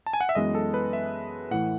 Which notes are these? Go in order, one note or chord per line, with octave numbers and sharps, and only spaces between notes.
A5
G#5
F#5
E5
F#2 E3 G#3 B3 D#5
A4
B4
E5
A2 E3 A3 F#5